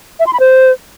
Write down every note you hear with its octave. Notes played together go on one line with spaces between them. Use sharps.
E5
C6
B5
C5